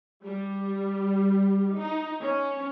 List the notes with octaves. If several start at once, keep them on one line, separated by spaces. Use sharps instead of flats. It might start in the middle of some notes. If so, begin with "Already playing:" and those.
G3
D#4
C#4